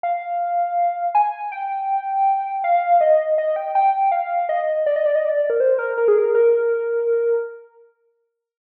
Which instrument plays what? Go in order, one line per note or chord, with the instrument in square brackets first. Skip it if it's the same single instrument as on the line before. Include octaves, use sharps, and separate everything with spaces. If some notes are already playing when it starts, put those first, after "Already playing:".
[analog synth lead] F5
G#5
G5
F5
D#5
D#5
G5
G5
F5
D#5
D5
D#5
D5
D#5
D5
A#4
C5
A#4
A#4
G#4
A#4
A#4